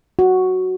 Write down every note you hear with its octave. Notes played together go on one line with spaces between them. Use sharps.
F#4